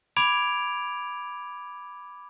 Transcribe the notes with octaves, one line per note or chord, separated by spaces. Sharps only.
B5 D6 G#6 D7 F7